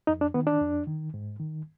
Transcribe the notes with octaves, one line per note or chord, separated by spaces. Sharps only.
F2 D#4
D4
D#3 B3
D4
F2
D#3
G#2
D#3